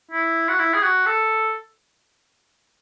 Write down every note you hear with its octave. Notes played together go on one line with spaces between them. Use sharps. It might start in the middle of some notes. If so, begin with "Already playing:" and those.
E4
F#4
E4
G#4
F#4
A4